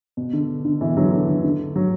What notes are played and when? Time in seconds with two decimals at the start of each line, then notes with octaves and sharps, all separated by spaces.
0.17 B2
0.33 D3
0.65 D3
0.81 B2 E3
0.97 D3 F#3
1.13 D3
1.29 D3
1.44 D3
1.76 D3 F#3